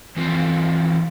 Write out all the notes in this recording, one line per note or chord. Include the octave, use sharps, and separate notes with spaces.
E3 C4 F4 C5